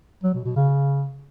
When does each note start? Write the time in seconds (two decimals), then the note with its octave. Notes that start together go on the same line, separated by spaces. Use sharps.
0.23 F#3
0.34 B2
0.45 B2
0.56 C#3